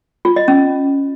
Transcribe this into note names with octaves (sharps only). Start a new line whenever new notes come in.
F4
D#5
C#4